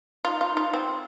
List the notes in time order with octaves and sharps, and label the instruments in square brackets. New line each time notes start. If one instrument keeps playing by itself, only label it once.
[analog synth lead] D#4 [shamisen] F4
[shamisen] F4
F4
C4